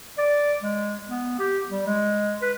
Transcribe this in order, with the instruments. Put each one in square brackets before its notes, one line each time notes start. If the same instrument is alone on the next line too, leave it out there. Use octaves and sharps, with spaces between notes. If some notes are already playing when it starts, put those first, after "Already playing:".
[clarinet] D5
G#3
B3
G4
G3
G#3
B4